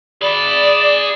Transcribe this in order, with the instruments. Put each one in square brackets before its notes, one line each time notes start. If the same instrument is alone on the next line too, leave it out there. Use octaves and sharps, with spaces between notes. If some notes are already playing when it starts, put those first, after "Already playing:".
[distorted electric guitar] G#4 B5 [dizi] D5